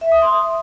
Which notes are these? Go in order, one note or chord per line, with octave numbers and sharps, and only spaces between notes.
E5
D#6
C6